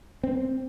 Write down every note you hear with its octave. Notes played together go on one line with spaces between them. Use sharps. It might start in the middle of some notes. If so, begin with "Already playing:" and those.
C4